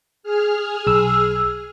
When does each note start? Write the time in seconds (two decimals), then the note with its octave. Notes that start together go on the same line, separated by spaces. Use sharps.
0.23 G#4 F6
0.87 B1 E6